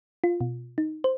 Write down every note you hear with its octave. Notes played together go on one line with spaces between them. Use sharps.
F4
B2
D#4
C5